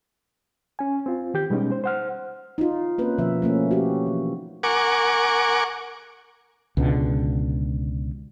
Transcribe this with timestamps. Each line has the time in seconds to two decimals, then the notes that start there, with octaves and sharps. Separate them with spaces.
0.79 C#4 G#5
1.06 C4 F4
1.34 D#3 G4 G6
1.50 B2 G3 G#3 B3 C#4 D#4
1.72 C5
1.84 C5 F#5 F6
2.58 D#4 F4
2.98 A#3 C4 C#4 B4
3.18 B2 D3 F3 E5
3.42 A3 A#3 C#4
3.71 F#4 G4
4.07 E3
4.63 A#4 F#5 G#5 C#6 D6
6.77 C#2 B2 D3